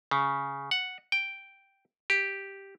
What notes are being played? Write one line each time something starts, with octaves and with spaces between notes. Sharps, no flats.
C#3
F#5
G5
G4